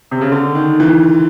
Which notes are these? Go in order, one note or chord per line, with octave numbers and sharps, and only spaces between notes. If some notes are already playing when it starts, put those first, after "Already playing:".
C3
C#3
D3
D#3
E3